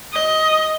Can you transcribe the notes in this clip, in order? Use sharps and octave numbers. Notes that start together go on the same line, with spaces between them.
D#5